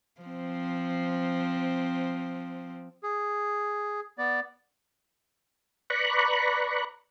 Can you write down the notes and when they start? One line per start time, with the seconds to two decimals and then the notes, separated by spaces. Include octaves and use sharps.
0.21 F3 C4
3.03 G#4
4.18 B3 D5
5.90 B4 D5 A#5 B5 C#6 F#6